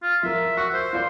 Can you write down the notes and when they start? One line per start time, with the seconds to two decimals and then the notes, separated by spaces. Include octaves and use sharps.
0.02 F4
0.23 F3 A#4 E5
0.57 F#4 E6
0.74 C5
0.93 F4 D5 C6